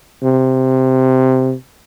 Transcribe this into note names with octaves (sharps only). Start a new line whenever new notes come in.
C3